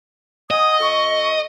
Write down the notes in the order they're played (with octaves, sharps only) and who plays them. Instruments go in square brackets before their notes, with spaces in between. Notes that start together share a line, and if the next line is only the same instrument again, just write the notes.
[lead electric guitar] D#5 [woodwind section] F#5 G#5 D#6
[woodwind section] F2 A4 C#6